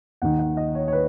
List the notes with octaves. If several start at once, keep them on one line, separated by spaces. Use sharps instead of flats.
D#2 D#3 F#5
F#5
D#5
C#5
C#5
B4